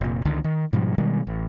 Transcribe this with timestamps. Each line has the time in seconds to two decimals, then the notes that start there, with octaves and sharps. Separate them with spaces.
0.01 F1 A#2
0.25 C#2 D3 D#3
0.44 D#3
0.73 G#2 B2 F3 G3
0.98 B2 D#3 G3 G#3
1.27 A1